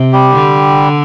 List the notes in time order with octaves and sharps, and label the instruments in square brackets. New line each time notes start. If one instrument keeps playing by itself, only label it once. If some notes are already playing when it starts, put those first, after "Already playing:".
Already playing: [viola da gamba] C3
[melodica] G3 G4
[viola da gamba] D3